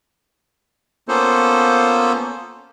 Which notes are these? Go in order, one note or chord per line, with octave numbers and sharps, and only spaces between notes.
A#3 B3 C#4 F4 A4 C5